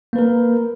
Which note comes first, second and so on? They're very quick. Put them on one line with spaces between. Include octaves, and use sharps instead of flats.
A#3 B4 A#4